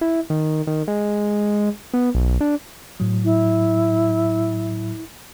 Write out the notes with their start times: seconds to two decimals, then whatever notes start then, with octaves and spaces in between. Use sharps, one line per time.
0.01 E4
0.30 D#3
0.67 D#3
0.88 G#3
1.94 B3
2.15 B1
2.41 D4
3.00 A2 F#3
3.24 E4